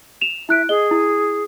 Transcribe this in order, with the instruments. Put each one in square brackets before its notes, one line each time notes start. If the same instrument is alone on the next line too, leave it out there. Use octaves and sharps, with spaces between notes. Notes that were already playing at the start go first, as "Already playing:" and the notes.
[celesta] E7 F7
[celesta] E4 F#6 D7 [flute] E5
[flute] G#4 [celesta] D#5 G7
[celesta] E4